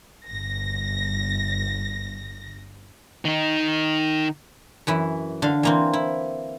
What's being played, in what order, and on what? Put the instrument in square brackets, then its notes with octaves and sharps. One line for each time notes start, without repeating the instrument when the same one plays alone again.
[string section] G1 A#6
[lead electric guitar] D#3 D#4
[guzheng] F#2 E3 E4
D3 F5
E3 A#3 C4
E4